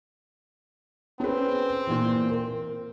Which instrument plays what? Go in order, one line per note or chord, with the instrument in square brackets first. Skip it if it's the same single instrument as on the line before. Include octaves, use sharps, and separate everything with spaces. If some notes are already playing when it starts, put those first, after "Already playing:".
[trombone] C4 [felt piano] C#4 G#4 B4
[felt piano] A#2 E3
A#4